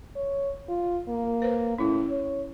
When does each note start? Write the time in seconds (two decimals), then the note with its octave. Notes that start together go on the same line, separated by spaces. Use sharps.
0.16 C#5
0.69 F4
1.08 A#3
1.42 B4 C5
1.78 A2 C#4 E4
2.10 C#5